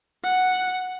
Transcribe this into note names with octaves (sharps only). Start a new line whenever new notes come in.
F#5